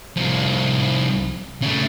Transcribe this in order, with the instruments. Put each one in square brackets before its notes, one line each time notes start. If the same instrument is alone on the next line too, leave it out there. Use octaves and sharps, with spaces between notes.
[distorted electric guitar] C2 F3
C#3 A3